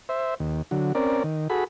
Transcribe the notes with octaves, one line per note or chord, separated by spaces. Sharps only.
C5 E5
D#2
D3 F#3
C4 C#4 A#4 D5
D#3
F#4 G#4 A4 B5